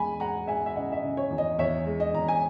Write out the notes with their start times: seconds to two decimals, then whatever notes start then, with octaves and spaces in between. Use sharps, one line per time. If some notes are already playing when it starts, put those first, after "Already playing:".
Already playing: E2 G#3 G#5 B5
0.20 G#3 F#5 A#5
0.47 G#3 E5 G#5
0.66 E5
0.76 C#3 D#5 F#5
0.92 E5
0.96 D#5
1.04 C#3
1.17 C#5
1.30 E2
1.38 D#5
1.59 E2 C#5 E5
1.86 G#3
2.00 D#5
2.14 E2 A#5
2.28 G#5